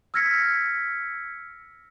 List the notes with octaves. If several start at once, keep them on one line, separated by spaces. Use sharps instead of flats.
E6 F6 G#6 A#6 B6 C#7